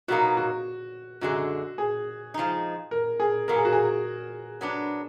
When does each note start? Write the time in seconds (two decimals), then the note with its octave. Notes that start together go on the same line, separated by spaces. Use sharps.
0.08 B2 F#3 A#3 D#4 F#4
0.37 F#4
1.21 F#2 D3 G#3 F#4
1.78 G#4
2.34 F3 G#3 D#4
2.91 A#4
3.20 G#4
3.48 B2 F#3 A#3 A#4
3.56 G#4
3.65 F#4
3.72 G#4
4.61 F#3 B3 D4